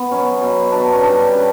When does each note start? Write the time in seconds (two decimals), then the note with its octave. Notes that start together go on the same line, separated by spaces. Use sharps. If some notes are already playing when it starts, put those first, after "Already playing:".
Already playing: B3
0.11 B2 F#3 C#4
0.41 B2 F#3
0.72 B2 F#3 D4
0.93 C#4
1.03 C#3 G3 D4
1.34 C#3 G3